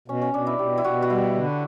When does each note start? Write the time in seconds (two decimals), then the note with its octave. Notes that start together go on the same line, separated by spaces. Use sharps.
0.08 B2 C#4
0.22 C#4
0.33 B2 D4
0.47 E4
0.59 B2 G4
0.78 E4
0.84 B2 F#4
1.02 F#4
1.10 G3 E4
1.35 D3